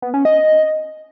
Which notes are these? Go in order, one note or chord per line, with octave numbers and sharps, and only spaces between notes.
B3
C#4
D#5